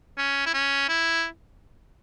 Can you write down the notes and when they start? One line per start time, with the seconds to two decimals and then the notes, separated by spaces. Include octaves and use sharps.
0.18 C#4
0.46 E4
0.54 C#4
0.89 E4